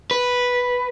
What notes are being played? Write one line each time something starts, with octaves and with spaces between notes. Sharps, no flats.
B4